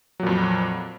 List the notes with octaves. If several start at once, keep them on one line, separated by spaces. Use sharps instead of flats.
F2 A#2 F#3